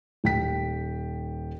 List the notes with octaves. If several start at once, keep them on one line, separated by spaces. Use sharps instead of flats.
D#1 G5 B6